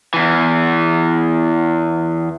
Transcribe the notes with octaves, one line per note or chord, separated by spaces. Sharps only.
E2 E3